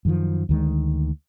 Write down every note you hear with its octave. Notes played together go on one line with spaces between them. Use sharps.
F#2 D#3 F3
D2 D#3 G#3